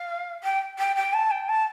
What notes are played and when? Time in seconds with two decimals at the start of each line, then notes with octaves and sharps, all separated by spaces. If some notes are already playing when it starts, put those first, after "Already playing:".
Already playing: F5
0.43 G5
0.78 G5
0.96 G5
1.13 A5
1.31 G5
1.49 A5